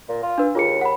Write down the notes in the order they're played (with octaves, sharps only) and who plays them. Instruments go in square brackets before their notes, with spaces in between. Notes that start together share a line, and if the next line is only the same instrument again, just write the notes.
[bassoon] A#2
F4
[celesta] D4 B4
[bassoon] D#2 [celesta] F4 G#4 C#7
[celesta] F#5 B5